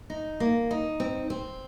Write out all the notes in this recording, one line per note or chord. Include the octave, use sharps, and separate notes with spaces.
D#4
A#3
D#4
C4
C4